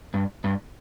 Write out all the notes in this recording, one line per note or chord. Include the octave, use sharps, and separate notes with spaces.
G2
G2